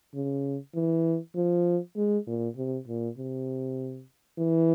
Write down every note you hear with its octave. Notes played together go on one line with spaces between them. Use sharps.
C#3
E3
F3
G#3
A#2
C3
A#2
C3
E3